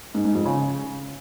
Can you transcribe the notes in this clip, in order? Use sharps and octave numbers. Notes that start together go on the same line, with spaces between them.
G#2
G#2
F2
C#3